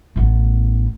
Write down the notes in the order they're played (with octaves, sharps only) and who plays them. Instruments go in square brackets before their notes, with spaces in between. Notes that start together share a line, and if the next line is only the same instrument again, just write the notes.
[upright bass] A1 B3